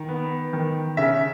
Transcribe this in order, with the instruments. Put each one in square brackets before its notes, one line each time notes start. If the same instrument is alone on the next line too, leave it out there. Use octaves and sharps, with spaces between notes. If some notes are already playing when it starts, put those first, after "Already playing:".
Already playing: [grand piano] D#3
B3
D#3
C#3 E5